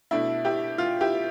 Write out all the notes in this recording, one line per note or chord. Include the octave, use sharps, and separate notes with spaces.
B2 A3 D4 E4
E4 G4
F4
E4 G4